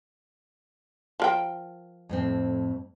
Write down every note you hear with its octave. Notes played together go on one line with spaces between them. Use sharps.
F3 A#4 G5
F2 A2 C4